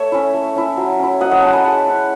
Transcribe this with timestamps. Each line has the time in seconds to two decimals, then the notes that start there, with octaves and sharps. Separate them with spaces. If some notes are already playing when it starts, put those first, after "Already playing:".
Already playing: A3 C#5 E5
0.12 C#4 E4
0.34 A3
0.56 C#4 E4
0.77 F#3
0.99 C#4 E4
1.21 F#3 D#5 F#5
1.31 D#5 F#5
1.42 C#4 E4 F#5 A5
1.53 G#5 B5
1.64 G#3 F#5 A5
1.86 C#4 E4